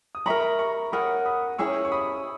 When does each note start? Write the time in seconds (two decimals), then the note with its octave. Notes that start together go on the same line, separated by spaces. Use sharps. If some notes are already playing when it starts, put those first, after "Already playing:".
0.15 D#6
0.26 A#4 E5 A#5 B5 C#6
0.59 A#5 C#6
0.92 A#4 C#5 F#5 B5 D#6
1.26 B5 D#6
1.58 C#4 E4 G#4 C#5 C#6 E6
1.85 C#6
1.92 B5 D#6